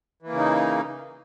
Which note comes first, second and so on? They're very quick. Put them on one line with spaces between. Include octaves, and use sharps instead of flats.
E3 A#3 C#3 D#4